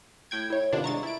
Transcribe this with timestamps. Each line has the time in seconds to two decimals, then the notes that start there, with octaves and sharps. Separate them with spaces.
0.31 A2 G5 G#6
0.50 E4 C#5
0.72 C3 D#3 B3 D4 F4
0.84 G2 D3 G#3 A#5 C#6 A6
1.03 E4 D7